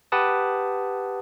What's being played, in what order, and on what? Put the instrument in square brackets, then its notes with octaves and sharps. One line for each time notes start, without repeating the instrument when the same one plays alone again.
[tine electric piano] G4 B4 F#5 A5 D#6